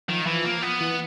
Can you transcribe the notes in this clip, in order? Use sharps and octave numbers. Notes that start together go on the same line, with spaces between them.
D#3 F3
E3 F3
A#3
B3
E3